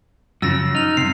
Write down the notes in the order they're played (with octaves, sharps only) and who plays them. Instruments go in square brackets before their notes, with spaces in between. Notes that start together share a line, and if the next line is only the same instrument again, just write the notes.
[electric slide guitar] F#2 C#3 F3 [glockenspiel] E6 A6 A#6
[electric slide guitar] D#4 [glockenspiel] F6 F7
[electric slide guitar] G2 C3 [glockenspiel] C7